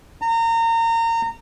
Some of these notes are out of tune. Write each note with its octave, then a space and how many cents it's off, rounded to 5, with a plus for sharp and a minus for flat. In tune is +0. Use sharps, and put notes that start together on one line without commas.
A#5 -30